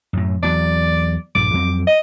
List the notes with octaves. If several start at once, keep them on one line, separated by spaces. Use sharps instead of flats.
F#2 A2
E2 F#3 D5
A#1 G2 D6
F2 F#3 C4
D#5